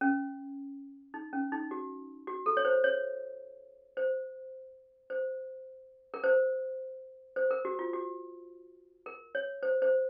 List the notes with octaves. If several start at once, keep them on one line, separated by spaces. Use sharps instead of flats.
C#4
D#4
C#4
D#4
F#4
F#4
A4
C#5
C5
C#5
C5
C5
A#4
C5
C5
A#4
F#4
F4
F#4
A#4
C#5
C5
C5